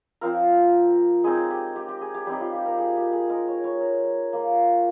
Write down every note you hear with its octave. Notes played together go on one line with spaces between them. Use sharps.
F3 C4 F4 A#4
G#3 C4 D#4 G#4
G4
G4
G4
G#4
G4
G3 C4 D#4 G4
F4
G4
A#4
G#4
G4
G#4
G#3 D#4 A#4
C#5
C#5
A#4
A#3 F4